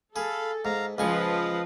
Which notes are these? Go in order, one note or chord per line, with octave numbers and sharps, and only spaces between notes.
G#4 A4 F5 B5
G#2 F5 A#5
C#2 F3 B4 D#5 F5 G#5 C#6